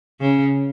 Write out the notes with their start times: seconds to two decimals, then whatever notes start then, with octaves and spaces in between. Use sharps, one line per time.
0.21 C#3